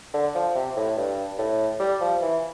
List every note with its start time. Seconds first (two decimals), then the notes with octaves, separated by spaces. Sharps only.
0.13 D3
0.35 F3
0.55 C3
0.76 A2
0.97 G2
1.38 A2
1.79 G3
2.00 F3
2.21 E3